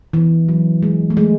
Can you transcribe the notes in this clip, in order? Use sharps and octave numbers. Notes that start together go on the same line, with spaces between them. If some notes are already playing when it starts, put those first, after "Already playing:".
E3
F#3
G#3
A3
G#3